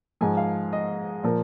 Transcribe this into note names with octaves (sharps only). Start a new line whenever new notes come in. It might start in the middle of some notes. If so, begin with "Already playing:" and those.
G#2 F3 G#5
F5
D#5
A#2 F3 A#4